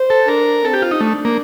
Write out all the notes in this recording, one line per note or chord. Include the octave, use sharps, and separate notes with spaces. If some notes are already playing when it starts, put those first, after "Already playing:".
Already playing: C5
A4
D4 A#4
C4 A4
G4
F4
D#4
A3 D4
A#3